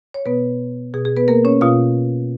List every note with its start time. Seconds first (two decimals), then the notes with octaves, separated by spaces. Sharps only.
0.14 C#5
0.26 B2 B3 B4
0.94 B2 G#4
1.05 G#4
1.17 B3 B4
1.28 A#3 A#4
1.45 C#4 C#5
1.61 B2 F4 F5